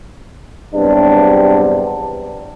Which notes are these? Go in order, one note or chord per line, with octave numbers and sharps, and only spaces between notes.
E2 G2 C3 F#3 D4